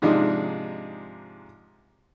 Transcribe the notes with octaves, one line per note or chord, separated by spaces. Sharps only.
G#2 C3 F3 G#3 D4 D#4